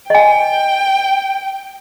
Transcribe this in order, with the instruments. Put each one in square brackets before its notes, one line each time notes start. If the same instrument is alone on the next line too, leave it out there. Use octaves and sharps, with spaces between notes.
[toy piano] D#5 G#5 [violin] G5